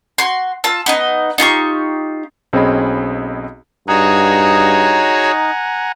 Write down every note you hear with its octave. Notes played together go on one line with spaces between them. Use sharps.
F#4 C6
F4 A5 E6
B3 D#4 D#5
D#4 F4 G4 C#6
B1 C4 C#4 G#4 D#5 B5
G2 D#4 F#4 G#4 C#5 F#5 G#5 A#5